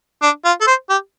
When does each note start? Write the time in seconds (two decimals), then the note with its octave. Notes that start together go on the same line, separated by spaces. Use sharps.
0.22 D4
0.45 F4
0.61 A4
0.67 C5
0.89 G4